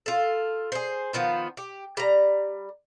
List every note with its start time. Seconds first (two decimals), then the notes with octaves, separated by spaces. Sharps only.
0.06 F4 A4
0.72 G#4 C5
1.13 D#3 F3 B3 F4
1.57 G4
1.97 G3 A#5